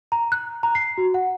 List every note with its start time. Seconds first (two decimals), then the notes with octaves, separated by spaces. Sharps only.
0.12 A#5
0.32 F#6
0.63 A#5
0.75 C7
0.98 F#4
1.14 F#5